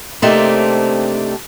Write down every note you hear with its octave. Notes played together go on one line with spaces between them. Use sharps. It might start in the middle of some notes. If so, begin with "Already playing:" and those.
C3 A3 A#3 C4 D4 D#4